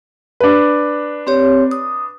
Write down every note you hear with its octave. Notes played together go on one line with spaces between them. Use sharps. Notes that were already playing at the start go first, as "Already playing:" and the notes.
D4 B4
C4 G4 C#5
D#6